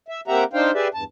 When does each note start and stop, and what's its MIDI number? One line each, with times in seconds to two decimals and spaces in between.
0.08 0.21 76
0.28 0.44 58
0.28 0.44 60
0.28 0.44 67
0.28 0.44 76
0.28 0.44 78
0.28 0.44 82
0.53 0.71 62
0.53 0.71 63
0.53 0.71 72
0.53 0.71 77
0.53 0.71 79
0.74 0.88 67
0.74 0.88 68
0.74 0.88 71
0.74 0.88 74
0.74 0.88 76
0.94 1.04 40
0.94 1.04 43
0.94 1.04 81